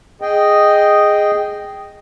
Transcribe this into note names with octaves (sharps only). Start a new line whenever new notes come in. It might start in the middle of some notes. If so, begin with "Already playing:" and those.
G#4 D#5 G5